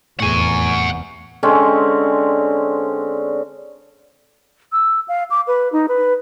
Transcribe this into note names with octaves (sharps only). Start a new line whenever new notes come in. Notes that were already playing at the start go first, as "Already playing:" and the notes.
F1 E2 A2 G#4 F#5 G#5 C#6
D3 G#3 C4 C#4
E6
F5
D6
B4
D#4
B4